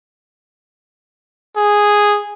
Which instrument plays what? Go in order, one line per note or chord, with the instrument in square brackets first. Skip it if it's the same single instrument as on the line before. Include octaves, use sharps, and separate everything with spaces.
[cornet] G#4